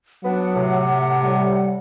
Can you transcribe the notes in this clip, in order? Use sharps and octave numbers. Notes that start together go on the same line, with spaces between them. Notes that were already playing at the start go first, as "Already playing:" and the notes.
F#3 B3 D4 F#5
A2 C3
G3